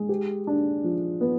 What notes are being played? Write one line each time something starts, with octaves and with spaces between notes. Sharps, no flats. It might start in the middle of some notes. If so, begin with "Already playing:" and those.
Already playing: G#3
G4
D4
F3
B3